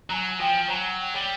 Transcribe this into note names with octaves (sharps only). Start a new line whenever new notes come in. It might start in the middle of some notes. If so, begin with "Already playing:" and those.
F#3 G#5 A#5
F3 G5
F#3 G#5 A#5
G5
G3